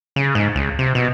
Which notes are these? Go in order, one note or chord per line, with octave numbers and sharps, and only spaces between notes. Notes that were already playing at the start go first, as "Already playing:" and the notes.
C#3
G#2
C#2
C3
B2